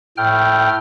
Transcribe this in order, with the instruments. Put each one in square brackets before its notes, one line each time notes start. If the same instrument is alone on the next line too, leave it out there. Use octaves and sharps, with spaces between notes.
[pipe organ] A2 G5 F6